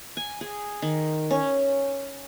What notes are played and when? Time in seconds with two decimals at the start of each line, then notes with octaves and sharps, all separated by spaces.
0.17 G#5
0.41 G#4
0.82 D#3
1.31 C#4